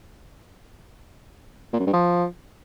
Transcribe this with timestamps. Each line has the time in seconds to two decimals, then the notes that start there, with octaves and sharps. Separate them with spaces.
1.73 A#2
1.80 F#2
1.86 G2
1.93 F3